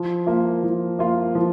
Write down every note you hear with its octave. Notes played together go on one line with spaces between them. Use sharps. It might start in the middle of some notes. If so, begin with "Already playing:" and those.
Already playing: F3
A#3 F4
F3
A#3 F4
F3